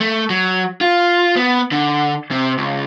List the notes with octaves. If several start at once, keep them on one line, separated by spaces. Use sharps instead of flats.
A3
F#3
F4
B3
D3
C3
C#2